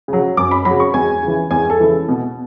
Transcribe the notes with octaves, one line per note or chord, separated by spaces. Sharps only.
C#3 F#3
F#2 D6
B5
C#3 F#3 B5
C#6
E2 G#5
C#3 E3
E2 G#5
A4
C#3 E3
B2